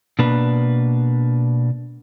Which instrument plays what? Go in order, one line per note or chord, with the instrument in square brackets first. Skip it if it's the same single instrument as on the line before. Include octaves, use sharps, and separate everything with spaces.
[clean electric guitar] B2 A#3 D4 B4